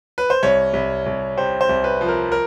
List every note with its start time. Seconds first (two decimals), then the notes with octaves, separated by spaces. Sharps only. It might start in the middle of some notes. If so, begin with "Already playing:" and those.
0.18 B4
0.30 C5
0.43 C2 C#5
0.73 C2
1.06 C2
1.38 C3 C5
1.61 C5
1.69 C2
1.84 B4
2.01 F3
2.08 A#4
2.32 A#4